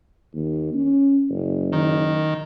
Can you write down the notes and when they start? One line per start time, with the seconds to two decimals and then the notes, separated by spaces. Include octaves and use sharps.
0.34 D#2
0.74 C#4
1.29 F#1
1.72 D#3